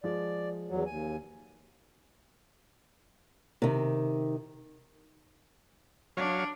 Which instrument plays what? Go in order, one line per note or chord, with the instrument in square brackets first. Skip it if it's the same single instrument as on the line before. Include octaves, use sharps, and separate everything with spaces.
[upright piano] F3 G#3 [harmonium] D5
[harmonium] E2 F#3
D#2 G#5
[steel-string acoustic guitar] C3 D#3
[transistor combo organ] F#3 C#5 F5 [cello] D4